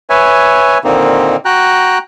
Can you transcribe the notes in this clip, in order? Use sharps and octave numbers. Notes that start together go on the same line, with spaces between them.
B4 C#5 E5 G#5
A#2 D3 D#3 A#3 C4 D#4
F#4 G5 A#5 F#6